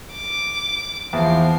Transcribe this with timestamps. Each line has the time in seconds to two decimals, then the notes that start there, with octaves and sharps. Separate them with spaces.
0.12 D6
1.13 E2 F3 B3 C7